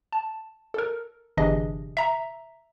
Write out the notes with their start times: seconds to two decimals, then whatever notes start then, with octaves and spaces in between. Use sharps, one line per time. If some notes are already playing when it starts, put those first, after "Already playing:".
0.12 A5
0.74 A4 A#4
1.37 G1 C3 E3 D4 G#4 D#5
1.97 E5 A#5